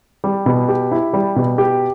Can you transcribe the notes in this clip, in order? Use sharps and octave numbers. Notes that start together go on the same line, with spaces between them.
G3
B2
G4
E4
G3
B2
G4